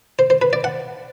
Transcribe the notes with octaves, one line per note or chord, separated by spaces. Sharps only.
C5
C5
B4
D5
F#5